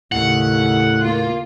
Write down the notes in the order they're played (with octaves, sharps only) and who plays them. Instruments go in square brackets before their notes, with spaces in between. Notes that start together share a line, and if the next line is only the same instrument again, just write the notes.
[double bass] D#2 C#3 [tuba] A2 [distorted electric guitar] F#5
[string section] A#3 F4